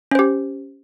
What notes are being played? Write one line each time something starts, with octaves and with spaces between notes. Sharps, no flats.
C#4 G4 C5